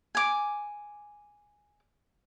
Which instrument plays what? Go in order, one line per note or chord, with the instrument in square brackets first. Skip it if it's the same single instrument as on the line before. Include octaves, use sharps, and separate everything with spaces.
[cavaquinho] G#5 D6